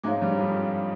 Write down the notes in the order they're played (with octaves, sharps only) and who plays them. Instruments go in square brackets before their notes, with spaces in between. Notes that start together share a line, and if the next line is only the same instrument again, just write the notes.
[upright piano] G#2 G#3 [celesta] C#5 F5 A#5 D6
[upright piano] G2 G3
F2 F3